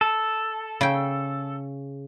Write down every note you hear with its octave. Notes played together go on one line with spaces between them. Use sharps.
A4
C#3 G5